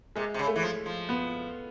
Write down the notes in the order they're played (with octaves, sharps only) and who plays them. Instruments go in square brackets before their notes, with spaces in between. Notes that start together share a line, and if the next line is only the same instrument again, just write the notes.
[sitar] C3 [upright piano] G#3
[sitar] C3
C#3
[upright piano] A3
[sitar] E3
F3
F3
[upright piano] B3